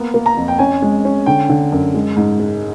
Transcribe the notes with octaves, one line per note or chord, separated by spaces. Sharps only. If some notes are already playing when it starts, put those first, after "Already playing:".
Already playing: A#3 B3
A#3
A#5
F2
G5
C#4 G#5
G#3
C#4
D3 G5
D3
F#2
G#3
G#2
G#3